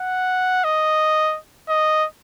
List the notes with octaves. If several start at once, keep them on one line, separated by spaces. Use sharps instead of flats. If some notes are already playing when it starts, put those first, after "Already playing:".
Already playing: F#5
D#5
D#5